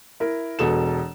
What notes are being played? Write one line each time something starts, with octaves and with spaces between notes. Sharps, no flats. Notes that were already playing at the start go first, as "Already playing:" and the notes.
E4 A#4
E1 B2 A4 E7